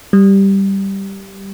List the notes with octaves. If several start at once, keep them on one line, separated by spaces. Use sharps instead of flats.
G3